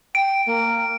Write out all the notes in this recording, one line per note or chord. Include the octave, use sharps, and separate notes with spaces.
G5 D7
A#3